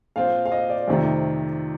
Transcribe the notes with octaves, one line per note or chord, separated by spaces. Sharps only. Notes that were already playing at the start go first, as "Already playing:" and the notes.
A#2 F3 C4 F4 F5
F5
D#5
D5
F2 C3 D#3 A3